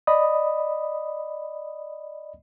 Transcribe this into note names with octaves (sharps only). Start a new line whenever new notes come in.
D5 D#5 B5 D#6